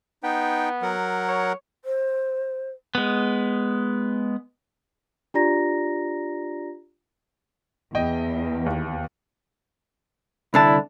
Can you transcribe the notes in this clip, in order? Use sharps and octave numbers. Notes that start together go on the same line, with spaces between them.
B3 D#4 G5
F#3 A#4 F#5
C#5
C5
G#3 B3
D4 F4 G4 D5 A#5 A#6
E2 D#5 G5
D#2
C2 D3 E4 A5